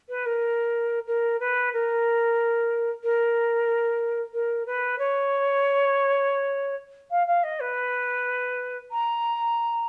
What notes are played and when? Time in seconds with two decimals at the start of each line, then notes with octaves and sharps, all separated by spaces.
0.09 B4
0.26 A#4
1.07 A#4
1.40 B4
1.73 A#4
3.04 A#4
4.34 A#4
4.66 B4
4.99 C#5
7.11 F5
7.27 F5
7.44 D#5
7.60 B4
8.91 A#5